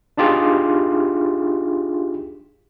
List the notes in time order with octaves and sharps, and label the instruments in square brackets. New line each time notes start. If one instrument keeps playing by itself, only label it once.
[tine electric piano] D4 D#4 F4 G4 G#4